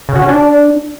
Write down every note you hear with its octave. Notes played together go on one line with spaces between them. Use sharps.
C#3
F#4
C#4
D4